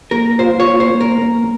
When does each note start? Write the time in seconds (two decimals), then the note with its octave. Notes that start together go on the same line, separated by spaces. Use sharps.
0.11 A#3 A#4
0.39 F4 C5
0.60 C#5
0.66 A#3
0.80 C5
0.94 A#3
1.01 A#4
1.22 A#3